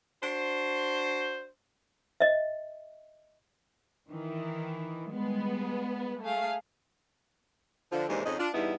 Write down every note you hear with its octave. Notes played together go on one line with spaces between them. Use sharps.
D4 F#4 C5
D#5 E5
D#3 E3
G3 G#3 B3
A3 G#4 F5
D3 F3
D#2 G#2 C3 E3 G#3 D4
F2 G#2 C#3 D#4 D#5
D4 F4
E2 G2 G3 B3 D#4 E4